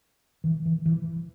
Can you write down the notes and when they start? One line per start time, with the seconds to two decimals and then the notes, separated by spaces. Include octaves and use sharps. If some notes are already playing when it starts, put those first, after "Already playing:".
0.44 E3
0.66 E3
0.86 E3